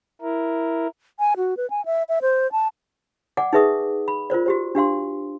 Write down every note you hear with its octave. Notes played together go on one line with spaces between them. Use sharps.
E4 A#4
G#5
F#4
B4
G#5
E5
E5
C5
A5
D5 F#5 G#5 D6
D#4 G#4 B4 E5 C#6 D#6
B5
F4 A#4 C5 D5
F#4 G4 C5
D4 G4 F5 C6